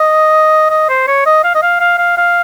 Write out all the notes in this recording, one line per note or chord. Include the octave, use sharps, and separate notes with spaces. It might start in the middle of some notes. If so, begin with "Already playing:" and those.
Already playing: D#5
D#5
C5
C#5
D#5
F5
D#5
F5
F5
F5
F5